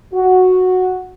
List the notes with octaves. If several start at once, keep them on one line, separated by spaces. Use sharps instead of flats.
F#4